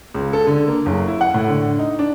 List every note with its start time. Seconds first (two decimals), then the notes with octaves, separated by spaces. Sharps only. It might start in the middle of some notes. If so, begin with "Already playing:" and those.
0.14 C#2
0.33 A4
0.47 D3
0.68 A#3
0.86 F#1
1.08 E4
1.21 F#5
1.34 A2
1.48 D3
1.79 D#4
1.99 D4